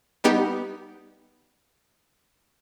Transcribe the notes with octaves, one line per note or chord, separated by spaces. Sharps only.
G3 B3 D#4 G4